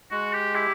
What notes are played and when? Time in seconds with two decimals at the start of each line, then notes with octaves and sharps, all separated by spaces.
0.11 G#3 F#4
0.33 G4
0.54 E4 G4